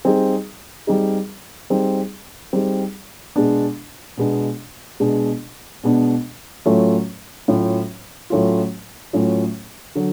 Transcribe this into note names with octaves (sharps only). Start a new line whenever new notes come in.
G3 C4 D#4 G#4
G3 C4 D#4 G#4
G3 C4 D#4 G#4
G3 C4 D#4 G#4
B2 G#3 B3 D4
B2 G#3 B3 D4
B2 G#3 B3 D4
B2 G#3 B3 D4
A2 F#3 A3 C#4 F4
A2 F#3 A3 C#4 F4
A2 F#3 A3 C#4 F4
A2 F#3 A3 C#4 F4
D3 F#3